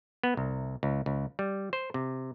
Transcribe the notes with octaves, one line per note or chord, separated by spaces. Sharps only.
B3
C2
C#2
C#2
G3
C5
C3